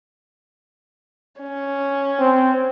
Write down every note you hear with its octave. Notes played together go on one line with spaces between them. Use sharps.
C#4
C4